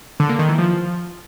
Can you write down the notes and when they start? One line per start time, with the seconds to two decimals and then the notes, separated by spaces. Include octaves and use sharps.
0.20 D3
0.29 A#3
0.39 D#3
0.49 E3
0.58 F3